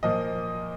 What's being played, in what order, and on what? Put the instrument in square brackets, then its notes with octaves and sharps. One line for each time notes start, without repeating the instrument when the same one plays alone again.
[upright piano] A#2 F3 A#3 D#5